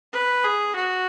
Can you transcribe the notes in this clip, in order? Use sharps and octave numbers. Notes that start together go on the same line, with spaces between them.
B4
G#4
F#4